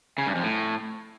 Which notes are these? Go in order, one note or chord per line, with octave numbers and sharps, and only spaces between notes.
C#3
G2
F2
A2